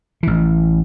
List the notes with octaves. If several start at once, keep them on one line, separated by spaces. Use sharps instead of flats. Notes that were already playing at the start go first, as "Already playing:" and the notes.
A1 E3